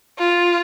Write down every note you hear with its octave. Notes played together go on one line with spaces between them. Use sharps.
F4